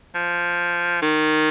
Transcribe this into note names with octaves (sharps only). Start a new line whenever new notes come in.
F3
D#3